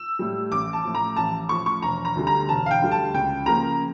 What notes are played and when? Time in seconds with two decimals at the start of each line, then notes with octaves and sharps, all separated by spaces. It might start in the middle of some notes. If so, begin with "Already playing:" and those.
Already playing: E6
0.19 A2 G3
0.52 A1 D6
0.73 A5
0.84 A2 F3
0.95 A#5
1.16 A1 A5
1.49 A2 F3 C#6
1.66 C#6
1.82 E1 A#5
2.05 A#5
2.16 D2 D3 G3
2.27 A#5
2.49 E1 A5
2.66 F5
2.71 G5
2.82 D2 D3 G3
2.91 A5
3.14 C#2 G5
3.46 C#3 F3 A#3 A#5